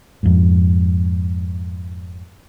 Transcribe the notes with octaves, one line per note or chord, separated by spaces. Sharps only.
F2 G#2